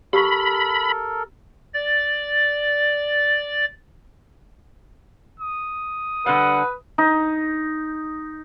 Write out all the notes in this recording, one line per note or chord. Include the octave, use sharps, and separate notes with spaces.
G4 A4 A#4 B5 C#6
D5 A6
D#6
D3 G3 B4 F#5
D#4